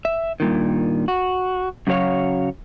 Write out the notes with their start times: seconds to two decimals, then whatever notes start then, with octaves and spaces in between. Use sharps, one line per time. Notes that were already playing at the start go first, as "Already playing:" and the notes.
0.05 E5
0.40 G2 A#2 D#3
1.08 F#4
1.87 F#2 C#3 F#3 F#4 C#5 F5